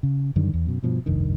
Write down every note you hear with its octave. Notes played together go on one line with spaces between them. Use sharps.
C#3
F#2 D3 D#3 G3
E2
F#2 B2
G2 B2 F3
F1 C2 G2 D#3